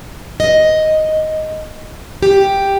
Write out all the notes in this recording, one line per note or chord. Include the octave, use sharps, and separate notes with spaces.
D#5
G4